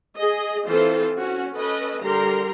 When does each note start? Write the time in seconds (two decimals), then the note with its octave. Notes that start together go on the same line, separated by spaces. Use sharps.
0.17 G#4 D#5
0.67 E3 C4 F4 A4 C5
1.18 C#4 F#4
1.53 C#4 A4 B4 D#5
2.02 D3 G3 G4 A#4 A#5 C6